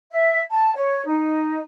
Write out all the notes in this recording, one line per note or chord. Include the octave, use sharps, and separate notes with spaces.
E5
A5
C#5
D#4